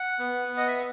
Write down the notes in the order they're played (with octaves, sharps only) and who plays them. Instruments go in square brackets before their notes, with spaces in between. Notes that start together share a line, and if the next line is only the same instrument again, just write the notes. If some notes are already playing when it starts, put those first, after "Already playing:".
Already playing: [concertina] F#5
B3
B3
D#5
E5